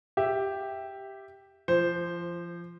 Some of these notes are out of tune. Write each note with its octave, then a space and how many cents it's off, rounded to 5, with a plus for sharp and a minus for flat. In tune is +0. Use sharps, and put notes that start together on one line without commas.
G4 +0 E5 +0
F3 -25 C5 +0